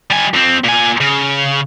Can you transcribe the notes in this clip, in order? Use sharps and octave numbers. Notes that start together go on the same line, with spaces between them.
G3 G#5
F2 C4
A#2 G#5
C#3